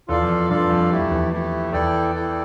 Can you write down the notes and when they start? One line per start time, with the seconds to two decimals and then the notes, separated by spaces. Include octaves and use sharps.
0.08 E2 F4 A4 D5 F5
0.22 F2
0.50 G2 F4 A4 D5 F5
0.70 F2
0.91 A3 E4 G4
1.00 F2
1.11 E2
1.32 A3 E4 G4
1.72 E2 E4 A4 D5 G5
2.15 E4 A4 D5 G5